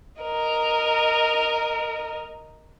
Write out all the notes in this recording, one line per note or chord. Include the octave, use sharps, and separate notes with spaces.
A#4 D#5